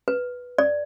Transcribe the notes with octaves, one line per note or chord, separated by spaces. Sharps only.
B4
D5